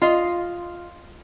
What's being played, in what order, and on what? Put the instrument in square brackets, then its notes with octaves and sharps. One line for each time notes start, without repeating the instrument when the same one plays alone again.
[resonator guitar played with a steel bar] F4 D#5